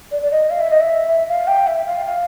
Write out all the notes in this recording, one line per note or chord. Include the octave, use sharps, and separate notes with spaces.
D5
D5
D#5
F5
E5
D#5
E5
F5
G5
E5
F5
F5